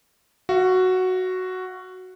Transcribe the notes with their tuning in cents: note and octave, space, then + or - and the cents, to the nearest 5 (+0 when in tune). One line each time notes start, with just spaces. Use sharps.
F#4 +0 F5 -40